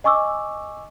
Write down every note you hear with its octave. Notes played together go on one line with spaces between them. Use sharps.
D#5 G#5 C#6 D6 E6